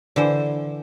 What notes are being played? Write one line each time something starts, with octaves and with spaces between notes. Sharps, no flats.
D3 E3 C5